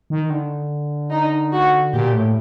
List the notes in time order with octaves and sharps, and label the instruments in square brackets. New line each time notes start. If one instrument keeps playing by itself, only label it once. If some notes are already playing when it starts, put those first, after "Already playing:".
[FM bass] D#3
D3
[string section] D#4
F#4
[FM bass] A#2 [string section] G4
[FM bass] A2